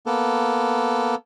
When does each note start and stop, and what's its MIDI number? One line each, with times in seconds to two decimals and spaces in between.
0.06 1.15 58
0.06 1.15 59
0.06 1.15 69